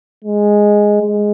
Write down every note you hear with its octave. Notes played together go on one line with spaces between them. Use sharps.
G#3
G#3